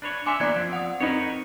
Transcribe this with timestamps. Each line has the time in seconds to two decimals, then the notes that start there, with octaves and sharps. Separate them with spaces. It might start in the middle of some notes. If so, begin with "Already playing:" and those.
0.02 D4 B4 C#5
0.26 D4 C#5 E5 G#5 C6 D6
0.40 E3 A#3 B3 D5 F#6 G#6
0.56 F3 C4
0.73 F#5 D#6
1.00 C4 D#4 A#4 B4 C#5 C#7